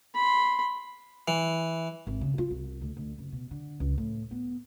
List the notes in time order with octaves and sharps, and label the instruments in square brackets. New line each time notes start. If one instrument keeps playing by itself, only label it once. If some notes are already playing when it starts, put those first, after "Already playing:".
[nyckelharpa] B5 C6
[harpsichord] E3
[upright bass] G#1
C#3
F4
C2
D2
D2
F#1
B2
D3
C#2
A2
B3